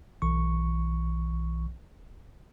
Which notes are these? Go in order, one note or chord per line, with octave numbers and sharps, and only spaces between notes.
B1 E3 C#6